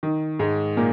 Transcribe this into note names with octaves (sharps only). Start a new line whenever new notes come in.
D#3
G#2 G#3
A#2 A#3